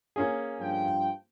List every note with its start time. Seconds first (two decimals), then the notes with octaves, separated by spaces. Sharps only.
0.16 A#3 C#4 G#4
0.60 G2 F3 G5